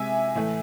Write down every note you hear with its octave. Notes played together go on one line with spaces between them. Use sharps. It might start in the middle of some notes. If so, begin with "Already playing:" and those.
Already playing: C3 G#3 E5 G#5
A2 E3 A3